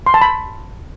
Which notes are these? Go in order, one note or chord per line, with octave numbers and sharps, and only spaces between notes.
C6
A5
B5